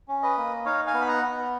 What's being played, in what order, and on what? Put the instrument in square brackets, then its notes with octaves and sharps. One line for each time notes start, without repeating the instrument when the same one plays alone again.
[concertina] C#4
B4 D#5
A#3
D#4 C#5 F5
F5 G#5
B3
B5
F#5 A#5
B3